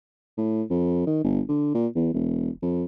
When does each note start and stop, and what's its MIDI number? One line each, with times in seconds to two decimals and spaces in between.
0.38 0.63 45
0.70 1.02 41
1.07 1.22 51
1.24 1.41 31
1.49 1.70 50
1.75 1.87 46
1.95 2.10 40
2.14 2.50 28
2.62 2.85 41